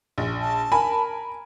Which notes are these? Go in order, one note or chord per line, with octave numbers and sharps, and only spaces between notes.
A#1
A5
A#4 G#5 B5